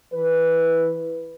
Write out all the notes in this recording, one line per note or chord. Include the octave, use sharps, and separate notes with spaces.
E3 B4